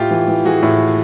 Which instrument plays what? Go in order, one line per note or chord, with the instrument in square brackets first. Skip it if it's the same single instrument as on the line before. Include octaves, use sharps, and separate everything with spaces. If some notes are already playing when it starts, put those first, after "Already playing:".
Already playing: [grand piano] A2 [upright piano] F4 G4
[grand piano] E3
E3
[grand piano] E3 [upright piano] F#4 G#4
[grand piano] A2